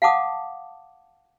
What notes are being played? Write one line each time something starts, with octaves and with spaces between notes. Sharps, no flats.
F5 F#5 A5 D6 D#6